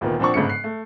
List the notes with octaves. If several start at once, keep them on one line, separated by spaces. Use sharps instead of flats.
D2 A#2 D#3 B3 A#4
A#2 F3 C4 D4 F#5 C#6
G1 G#2 C#3 A3 C#7
F#6 C7
A3